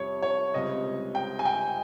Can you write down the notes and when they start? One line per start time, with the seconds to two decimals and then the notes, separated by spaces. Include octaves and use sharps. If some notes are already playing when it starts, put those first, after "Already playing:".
Already playing: F2 C3 G3 C#5
0.22 C#5
0.54 C#2 C3 G3 C4 D#5
1.15 G5
1.39 G#5
1.45 G5